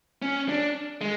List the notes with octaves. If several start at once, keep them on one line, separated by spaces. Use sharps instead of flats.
C#4
D4
G#3